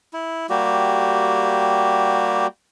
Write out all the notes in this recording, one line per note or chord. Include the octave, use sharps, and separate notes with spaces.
E4
G3 A#3 F#4 G4